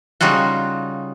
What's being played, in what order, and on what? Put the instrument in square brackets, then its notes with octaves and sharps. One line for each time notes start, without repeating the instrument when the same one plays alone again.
[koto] C#3 G3 D#4 F4 F#4